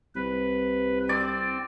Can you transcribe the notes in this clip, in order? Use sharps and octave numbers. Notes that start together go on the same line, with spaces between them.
C2 B4
C4 D5